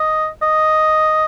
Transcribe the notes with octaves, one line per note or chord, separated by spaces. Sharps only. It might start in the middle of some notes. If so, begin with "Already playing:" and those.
Already playing: D#5
D#5